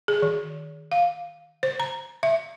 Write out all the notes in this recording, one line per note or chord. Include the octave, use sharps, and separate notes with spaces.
G#4
D#3
F5
C5
A#5
E5